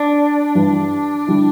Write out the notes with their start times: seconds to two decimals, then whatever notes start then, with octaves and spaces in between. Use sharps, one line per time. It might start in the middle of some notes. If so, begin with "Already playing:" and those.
Already playing: D4
0.55 G2 E3 G3
1.27 D3 G3 E4